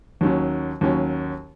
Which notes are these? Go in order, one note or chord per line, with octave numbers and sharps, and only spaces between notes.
D#2 D#3 F#3 C#4
D#2 D#3 F#3 C#4